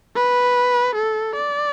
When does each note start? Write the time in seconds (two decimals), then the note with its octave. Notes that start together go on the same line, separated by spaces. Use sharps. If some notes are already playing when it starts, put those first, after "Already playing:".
0.16 B4
0.95 A4
1.35 D5